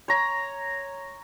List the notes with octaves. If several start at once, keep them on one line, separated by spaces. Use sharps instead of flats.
C#5 A#5